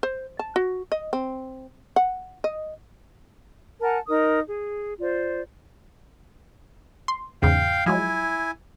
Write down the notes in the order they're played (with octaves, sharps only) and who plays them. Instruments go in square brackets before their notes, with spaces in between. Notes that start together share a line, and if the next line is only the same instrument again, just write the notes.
[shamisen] C5
A5
F#4
D#5
C4
F#5
D#5
[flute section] A#4 F#5 G#5 A5
D#4 A#4 D#5 D#6
G#4
F4 C5 D5
[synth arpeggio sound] C6
[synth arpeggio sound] E2 G#2 C#3 [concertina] F5 G5
[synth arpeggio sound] F3 F#3 G#3 [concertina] E4 G#5